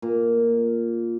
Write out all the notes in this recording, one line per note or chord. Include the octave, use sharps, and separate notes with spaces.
A#2